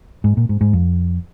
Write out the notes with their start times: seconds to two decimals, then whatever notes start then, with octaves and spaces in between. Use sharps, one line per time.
0.24 G#2
0.37 A#2
0.49 G#2
0.61 G#2
0.73 F2